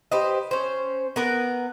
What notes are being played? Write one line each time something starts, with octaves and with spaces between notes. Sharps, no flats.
G4 B4 C5 D#5
C#4 C5
B3 A#4 B4